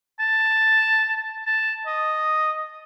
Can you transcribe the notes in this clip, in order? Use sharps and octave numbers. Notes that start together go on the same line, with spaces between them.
A5
A5
D#5